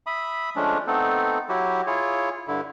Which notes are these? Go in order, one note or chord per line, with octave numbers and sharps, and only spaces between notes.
E5 B5 D#6
F3 G#3 A3 C#4 D4
A3 B3 C4 D#4 A4
F#3 E4 F#4 G4
E4 F4 G#4 C#5
G2 D3 E4